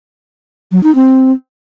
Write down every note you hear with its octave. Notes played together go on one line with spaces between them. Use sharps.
F#3
D#4
C4